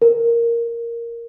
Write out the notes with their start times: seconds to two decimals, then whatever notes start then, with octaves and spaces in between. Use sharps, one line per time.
0.02 A#4